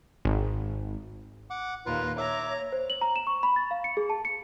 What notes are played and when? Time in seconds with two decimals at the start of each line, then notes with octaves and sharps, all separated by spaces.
0.25 G#1
1.50 F#5 D6
1.86 D#2 A#2 A#3 F4 B4
2.18 C#5 E5 A#5 D6
2.72 C5
2.90 F#7
3.01 A#5
3.16 E7
3.27 C#6
3.43 B5
3.56 A6
3.71 F5
3.84 C#7
3.97 G#4
4.10 A5
4.25 C#7